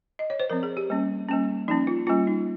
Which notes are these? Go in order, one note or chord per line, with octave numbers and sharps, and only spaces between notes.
D#5
C#5
C5
F3 C4 A#4
G#4
G4
G3 A#3 C#4
G3 A#3 C#4
F3 A#3 C#4 D#4
F4
G3 A#3 C#4 F4
D#4